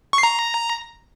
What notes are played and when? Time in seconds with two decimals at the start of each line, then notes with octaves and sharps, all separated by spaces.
0.13 C#6
0.18 C7
0.23 A#5